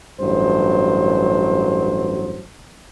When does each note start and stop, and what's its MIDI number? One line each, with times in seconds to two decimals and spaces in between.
0.20 2.44 33
0.20 2.44 43
0.20 2.44 54
0.20 2.44 72